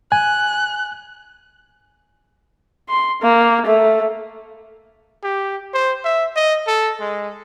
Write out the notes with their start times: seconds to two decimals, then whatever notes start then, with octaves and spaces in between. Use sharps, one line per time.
0.12 G#5 F#6
2.89 C6
3.22 A#3
3.66 A3
5.23 G4
5.74 C5
6.05 E5
6.36 D#5
6.67 A4
7.00 G#3